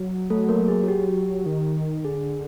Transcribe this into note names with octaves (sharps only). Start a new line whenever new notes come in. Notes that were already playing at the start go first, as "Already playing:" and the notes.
Already playing: F#3
A3 A4
A#3 A#4
G#4
F#4
G4
D#3
D3 G#4